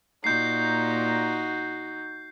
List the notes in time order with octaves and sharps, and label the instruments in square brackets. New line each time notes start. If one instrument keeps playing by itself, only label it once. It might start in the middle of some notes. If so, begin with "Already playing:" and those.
[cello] A#2 [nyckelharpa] D#4 F#4 [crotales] G6 C7